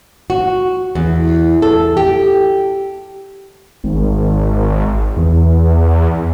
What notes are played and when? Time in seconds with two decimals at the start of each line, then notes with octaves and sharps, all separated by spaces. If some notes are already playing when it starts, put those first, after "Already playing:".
0.30 F#4
0.95 E2
1.62 A4
1.97 G4
3.84 G#1
5.17 E2